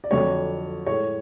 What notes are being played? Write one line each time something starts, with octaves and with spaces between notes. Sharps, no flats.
D5
F2 D3 F#3 A3 C#5
A2 G#3 C#5